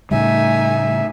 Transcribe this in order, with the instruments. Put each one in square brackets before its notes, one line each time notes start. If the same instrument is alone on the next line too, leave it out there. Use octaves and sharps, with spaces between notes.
[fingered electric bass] A2 C#3 G3 [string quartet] A3 D#4 G#5 [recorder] E5